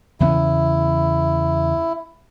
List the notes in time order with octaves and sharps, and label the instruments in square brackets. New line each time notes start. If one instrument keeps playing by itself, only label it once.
[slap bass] E2 C#3 B3 [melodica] E4